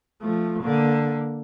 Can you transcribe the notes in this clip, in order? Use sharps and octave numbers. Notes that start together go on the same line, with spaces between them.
F3 A3
D3 A#3